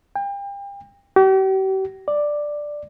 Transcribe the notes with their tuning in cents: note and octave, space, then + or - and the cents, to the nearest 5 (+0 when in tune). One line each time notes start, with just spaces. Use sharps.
G5 +35
G4 -40
D5 +5